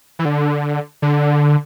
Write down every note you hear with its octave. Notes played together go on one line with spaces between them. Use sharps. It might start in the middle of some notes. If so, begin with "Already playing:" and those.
E3
D3
D3